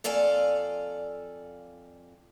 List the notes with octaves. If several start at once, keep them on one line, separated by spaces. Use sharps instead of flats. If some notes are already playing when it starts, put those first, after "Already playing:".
F2 A4 D5 F5 G#5